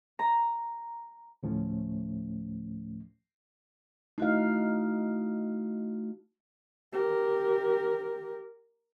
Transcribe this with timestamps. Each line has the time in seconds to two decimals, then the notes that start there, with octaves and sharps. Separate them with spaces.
0.19 A#5
1.43 D2 A2 F3 A3 C#4
4.18 A3 D#4 E4 F#4 F5
6.93 G4 A#4